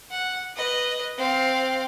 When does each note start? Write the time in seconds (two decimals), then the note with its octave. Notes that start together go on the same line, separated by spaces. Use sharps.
0.11 F#5
0.56 B4 D#5
1.18 C4 F5